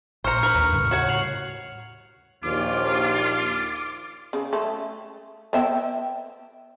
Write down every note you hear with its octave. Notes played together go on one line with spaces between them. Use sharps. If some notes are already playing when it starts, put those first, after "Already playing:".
A#1 C5 A#5 C#6 F6 C#7
D4 A#4 B4 F6
D#2
A2 C#3 G3
F#4 C#5 F#5
C7 F7 F#7
A#1 D#2 F4 D6
C#3
A3
B3 E5 G5